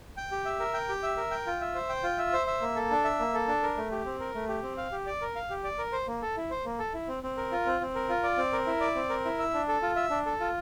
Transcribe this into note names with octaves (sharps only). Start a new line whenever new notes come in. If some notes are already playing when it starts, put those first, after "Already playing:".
G5
G4
E5
A#4
G5
G4
E5
A#4
G5
F4
E5
C5
G5
F4
E5
C5
E5
A#3
A4
D4
E5
A#3
A4
D4
A#4
A3
G4
C4
A#4
A3
G4
C4
F5
G4
D5
A#4
F5
G4
D5
A#4
C5
A#3
A4
E4
C5
A#3
A4
E4
C4
C4
A#4
F4
C4
C4
A#4
F4
D5
C4
A#4
E4
D5
C4
A#4
E4
E5
D4
A4
F4
E5
D4
A4
F4